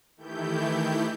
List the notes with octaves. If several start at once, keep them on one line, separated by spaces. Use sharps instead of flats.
D#3 E3 A3 E4 G4 G6